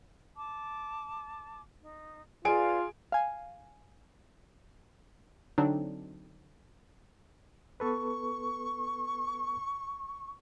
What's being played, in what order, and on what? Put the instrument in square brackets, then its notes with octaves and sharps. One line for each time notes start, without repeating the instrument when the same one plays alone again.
[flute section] A5 D6
D#4
[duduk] F4 [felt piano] G#4 G#5 D7 [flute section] B4 D5 F5
[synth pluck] F5 G#5
[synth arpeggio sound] D3 F#3 C4 D4 D#4
[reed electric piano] B3 A4 B4 [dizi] C#6